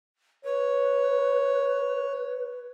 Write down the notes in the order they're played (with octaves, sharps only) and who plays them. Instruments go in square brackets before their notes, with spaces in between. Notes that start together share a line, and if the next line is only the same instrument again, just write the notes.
[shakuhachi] B4 [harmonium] C#5